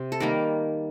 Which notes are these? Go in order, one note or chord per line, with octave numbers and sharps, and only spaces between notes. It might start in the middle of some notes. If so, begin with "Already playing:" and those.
Already playing: C3 C5
A4
D#3 G3 A#3 A#4